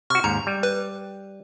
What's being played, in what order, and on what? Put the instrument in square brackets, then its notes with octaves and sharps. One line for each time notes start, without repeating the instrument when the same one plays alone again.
[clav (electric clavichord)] C3 F#4 [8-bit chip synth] C#6 F6
[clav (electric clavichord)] D#2 G#2 [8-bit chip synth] A#5
[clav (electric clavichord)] G3
[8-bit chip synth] B4